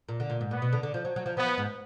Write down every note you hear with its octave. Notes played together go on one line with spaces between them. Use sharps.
A#2
D3
A#2
G#2
A#2 B3
B2
D3
D3
F3
F#3
F#3
F3
F3 B3
G#2